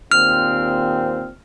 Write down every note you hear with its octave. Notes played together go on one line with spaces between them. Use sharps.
D#2 A#2 C4 F6